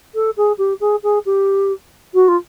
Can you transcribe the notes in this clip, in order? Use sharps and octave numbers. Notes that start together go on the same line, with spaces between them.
A4
G#4
G4
G#4
G#4
G4
F#4
F4